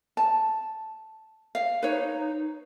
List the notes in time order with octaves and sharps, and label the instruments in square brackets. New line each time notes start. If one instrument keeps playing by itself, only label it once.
[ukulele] A5
F5
[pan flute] D#4 [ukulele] B4 C#5